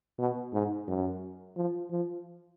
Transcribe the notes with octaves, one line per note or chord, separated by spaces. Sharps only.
B2
G#2
F#2
F3
F3